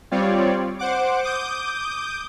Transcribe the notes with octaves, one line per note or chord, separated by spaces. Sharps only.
G3 C4 F4 C#5 D5
C5 F#5 D6
D6 D#6 G6